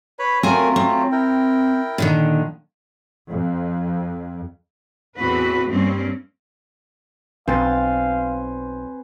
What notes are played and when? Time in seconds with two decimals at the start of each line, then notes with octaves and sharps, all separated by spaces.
0.19 B4 C#5 B5
0.43 F#3 A3 C4 F4 A#4 G#5
0.76 C4
1.12 E4 A#4 G5
1.98 A#2 D3 D#3
3.29 F2
5.18 E2 A2 E3 C4 F#4 B4
5.68 G2 G3 A#3 C4 C#4
7.48 B1 C4 B4 C5 F5 G#5 A6